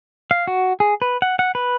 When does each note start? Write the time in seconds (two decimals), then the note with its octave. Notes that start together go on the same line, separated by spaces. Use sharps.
0.31 F5
0.47 F#4
0.80 G#4
1.02 B4
1.22 F#5
1.39 F#5
1.55 B4